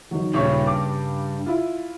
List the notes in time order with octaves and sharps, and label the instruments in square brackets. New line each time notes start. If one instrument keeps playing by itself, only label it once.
[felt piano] D#3 F#3
[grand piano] D#1 C#5 C#6 [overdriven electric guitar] G2 [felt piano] C#3
[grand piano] D6
E4 F4